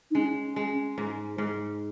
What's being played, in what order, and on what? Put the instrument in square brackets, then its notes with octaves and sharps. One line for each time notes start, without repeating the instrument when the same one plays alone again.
[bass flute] D#4
[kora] G#3 [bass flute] C#4
[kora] G#3
G#2
G#2